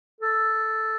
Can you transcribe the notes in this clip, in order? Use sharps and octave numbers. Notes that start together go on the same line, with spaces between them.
A4